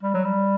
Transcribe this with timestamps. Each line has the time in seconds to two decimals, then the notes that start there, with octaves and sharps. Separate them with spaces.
0.03 G3
0.14 F#3
0.24 G3